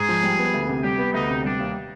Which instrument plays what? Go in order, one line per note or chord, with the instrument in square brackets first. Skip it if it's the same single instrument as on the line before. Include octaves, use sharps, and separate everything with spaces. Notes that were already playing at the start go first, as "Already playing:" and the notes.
Already playing: [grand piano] G#2 [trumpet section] G#4
[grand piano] F3
G3
B3
D2
C3
[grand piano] G3 [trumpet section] G4
[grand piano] B3
[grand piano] D2 [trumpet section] D#4
[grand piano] C3
[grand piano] G3 [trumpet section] D4
[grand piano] D#2